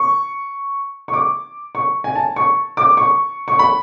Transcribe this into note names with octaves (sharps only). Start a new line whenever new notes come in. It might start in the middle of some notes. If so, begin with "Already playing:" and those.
Already playing: C#6
C#6
D6
C#6
G#5
A5
C#6
D6
C#6
C#6
B5